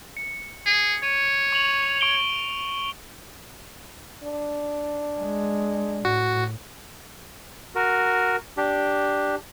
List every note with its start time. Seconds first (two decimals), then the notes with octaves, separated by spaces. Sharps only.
0.17 C#7
0.66 G#4
1.03 C#5 D#7
1.52 C#6 F7 F#7
2.01 C#6 D7 G7
4.23 D4
5.19 G#3
6.05 A2 F#4
7.75 F#4 A#4
8.57 D4 G4